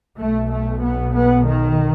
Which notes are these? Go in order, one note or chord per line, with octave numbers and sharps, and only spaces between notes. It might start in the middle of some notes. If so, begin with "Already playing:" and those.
B1 B2 A3
A3
B3
B3
D#3